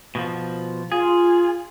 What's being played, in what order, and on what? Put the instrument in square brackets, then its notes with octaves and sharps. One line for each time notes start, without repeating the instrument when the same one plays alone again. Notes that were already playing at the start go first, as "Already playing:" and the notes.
[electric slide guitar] B2 D#3 F3
[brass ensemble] F4 [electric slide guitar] G#4